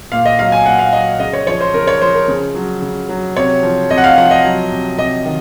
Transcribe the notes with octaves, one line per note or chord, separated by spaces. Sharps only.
A#2 F5
D#5
F#3 F5
G#5
A#2 F#5
F5
F#3 D#5
C#3 D#5
C#5
F3 C#5
C5
C#3 A#4
C#5
F3 C5
A#4
C#3
F#3
C#3
F#3
C3 C#5
F3
C3 D#5
F#5
F5
F3 F#5
D#5
F#3
C3
C3 D#5
D#3